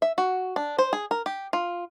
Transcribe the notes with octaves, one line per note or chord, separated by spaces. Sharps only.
E5
F#4
D4
C5
G#4
A#4
G4
F4